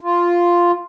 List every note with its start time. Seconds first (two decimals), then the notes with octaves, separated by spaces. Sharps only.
0.01 F4